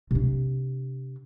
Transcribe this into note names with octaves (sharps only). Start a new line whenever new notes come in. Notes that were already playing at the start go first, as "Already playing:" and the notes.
C3 D4